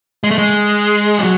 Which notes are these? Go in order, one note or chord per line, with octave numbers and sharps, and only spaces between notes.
G#3
A3
G#3
F#3